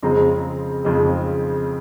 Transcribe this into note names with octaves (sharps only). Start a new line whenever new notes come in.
F2 C#3 F3 G#3 C4 A#5
F2 C#3 F3 G#3 C4